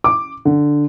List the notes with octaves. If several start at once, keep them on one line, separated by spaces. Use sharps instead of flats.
D6
D3